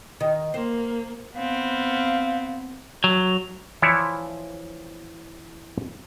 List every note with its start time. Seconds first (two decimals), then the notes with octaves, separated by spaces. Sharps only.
0.20 D#3
0.54 A#3 C5
1.36 B3 C4 F5
3.04 F#3
3.82 E3 F3 E4 C#5 D5 E5